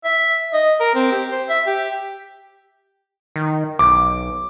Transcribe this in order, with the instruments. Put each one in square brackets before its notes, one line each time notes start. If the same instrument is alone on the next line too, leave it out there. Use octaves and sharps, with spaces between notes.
[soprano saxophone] E5
D#5
A#4
C4
G4
C5
E5
G4
[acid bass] D#3
[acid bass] B1 [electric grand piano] D6